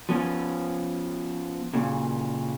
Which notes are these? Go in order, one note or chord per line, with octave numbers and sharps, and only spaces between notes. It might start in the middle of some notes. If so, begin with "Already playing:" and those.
F3 B3 C#4
A#2 C#3